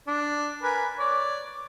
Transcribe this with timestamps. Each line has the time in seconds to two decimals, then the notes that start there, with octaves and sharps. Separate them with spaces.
0.07 D4
0.62 A#4 B4 G#5
0.99 C#5 D5